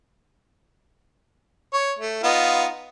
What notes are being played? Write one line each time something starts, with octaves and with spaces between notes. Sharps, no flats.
C#5
A3
B3 D#4 F4